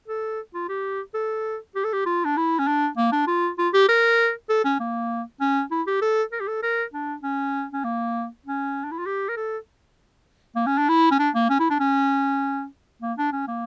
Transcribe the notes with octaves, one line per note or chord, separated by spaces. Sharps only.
A4
F4
G4
A4
G4
A4
G4
F4
D4
E4
C#4
D4
A#3
D4
F4
F4
G4
A#4
A4
C#4
A#3
C#4
E4
G4
A4
A#4
G4
A4
A#4
D4
C#4
C#4
A#3
C#4
D4
E4
F4
G4
A#4
A4
A#3
C#4
D4
E4
C#4
D4
A#3
C#4
E4
D4
C#4
A#3
D4
C#4
A#3